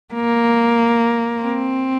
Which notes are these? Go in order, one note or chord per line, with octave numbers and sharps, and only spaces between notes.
A#3
C4